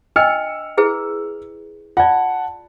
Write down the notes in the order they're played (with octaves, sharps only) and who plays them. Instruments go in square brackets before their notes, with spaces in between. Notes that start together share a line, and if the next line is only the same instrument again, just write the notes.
[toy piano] D4 D#5 G5 [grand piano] E6 F6 C#7
[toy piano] E4 G#4 B4
[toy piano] F4 D5 [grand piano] F#5 A5